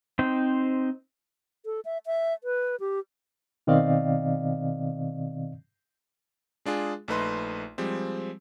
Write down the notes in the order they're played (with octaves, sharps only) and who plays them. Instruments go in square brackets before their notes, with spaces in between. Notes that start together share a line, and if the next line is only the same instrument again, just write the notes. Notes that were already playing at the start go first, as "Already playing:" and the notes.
[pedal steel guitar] C4 D#4 C5 G5
[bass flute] A4
E5
E5
B4
G4
[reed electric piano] B2 D#3 C4 D5 D#5 F5
[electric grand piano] G#3 D4 F4 G#4
A#1 A3 D#4 B4 D#5 C6
F3 G3 G#3 C4